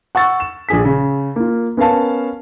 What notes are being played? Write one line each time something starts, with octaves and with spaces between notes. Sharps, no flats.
F#5 C#6 E6 A6
E7
A#1 F3 G#4 B6
C#3
A#3 F4
B3 C#4 A#4 F5 A5